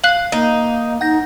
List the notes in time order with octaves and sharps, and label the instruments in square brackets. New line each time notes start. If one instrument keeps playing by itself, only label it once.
[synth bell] F5 C7 [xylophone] F#6 F#7
[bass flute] A#3 [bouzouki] D#4
[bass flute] D#4 [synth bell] F#5 G6 A#6